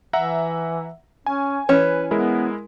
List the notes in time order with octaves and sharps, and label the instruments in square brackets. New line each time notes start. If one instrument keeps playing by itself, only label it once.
[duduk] E3 [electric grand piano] E5 F#5 A#5
[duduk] C#4 [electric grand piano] G#5
[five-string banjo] E3 C#4 [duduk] B4
[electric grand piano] G#3 E4 A#4 [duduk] B3